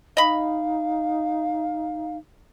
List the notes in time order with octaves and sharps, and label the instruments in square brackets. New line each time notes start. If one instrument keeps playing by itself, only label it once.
[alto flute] D#4 [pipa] D#5 B5 [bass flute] F5